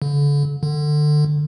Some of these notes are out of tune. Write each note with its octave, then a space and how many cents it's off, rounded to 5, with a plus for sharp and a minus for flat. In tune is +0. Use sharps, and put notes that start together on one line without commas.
D3 -35
D3 +25